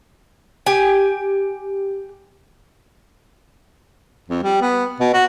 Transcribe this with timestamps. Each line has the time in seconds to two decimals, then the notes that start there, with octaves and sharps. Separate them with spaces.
0.66 G4 G#5
4.28 F2
4.43 G3
4.61 B3
5.00 B2
5.14 F#4